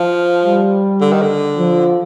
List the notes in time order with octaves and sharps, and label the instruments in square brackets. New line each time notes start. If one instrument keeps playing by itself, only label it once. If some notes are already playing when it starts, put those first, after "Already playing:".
Already playing: [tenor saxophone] F3
[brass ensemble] G3
[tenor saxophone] D3
D#3
D3
[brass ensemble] F3